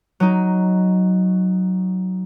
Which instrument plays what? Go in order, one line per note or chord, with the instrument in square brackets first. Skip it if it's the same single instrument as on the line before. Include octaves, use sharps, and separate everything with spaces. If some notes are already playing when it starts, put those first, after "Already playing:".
[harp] F#3 D#4